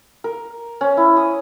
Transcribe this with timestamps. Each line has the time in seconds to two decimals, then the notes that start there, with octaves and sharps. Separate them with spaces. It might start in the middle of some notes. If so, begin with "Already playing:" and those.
0.24 A#4
0.81 C#4
0.97 E4
1.17 D#6